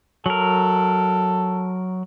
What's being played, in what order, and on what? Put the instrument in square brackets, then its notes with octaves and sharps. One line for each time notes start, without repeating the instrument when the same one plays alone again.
[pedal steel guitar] F#3 A#4 [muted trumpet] A4